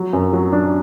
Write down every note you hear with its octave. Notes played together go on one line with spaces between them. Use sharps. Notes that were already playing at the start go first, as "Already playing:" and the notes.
Already playing: F#3
F#2
F#3
D4